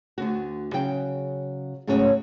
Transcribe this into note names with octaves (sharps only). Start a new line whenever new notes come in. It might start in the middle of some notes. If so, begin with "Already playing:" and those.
D2 D3 F#4
C#3 F#3 G5
G#2 C#3 F#3 A3 C#4 F#4